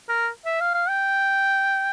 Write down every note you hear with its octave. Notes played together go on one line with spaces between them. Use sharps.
A#4
E5
F5
F5
G5